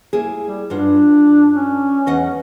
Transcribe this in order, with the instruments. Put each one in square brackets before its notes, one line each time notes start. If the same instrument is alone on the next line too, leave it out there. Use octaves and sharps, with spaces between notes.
[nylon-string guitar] A#3 E4 G#4
[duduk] G3
[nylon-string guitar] G2 F4 F#5 [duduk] D4
[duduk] C#4
[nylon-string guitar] E2 D#5 F#5